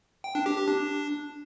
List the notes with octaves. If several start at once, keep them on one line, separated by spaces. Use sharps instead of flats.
G5
D4
G4
G4
D4